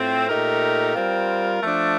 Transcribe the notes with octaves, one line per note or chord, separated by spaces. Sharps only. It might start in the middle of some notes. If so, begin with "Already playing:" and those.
Already playing: A2 A3 C4 F4
A#2 A3 D#4 G4 A#4
G3 C4 F4 A#4
F3 A3 D4